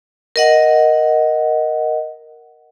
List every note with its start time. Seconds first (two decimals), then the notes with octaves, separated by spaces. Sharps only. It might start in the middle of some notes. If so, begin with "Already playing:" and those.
0.36 A#4 D#5 F#5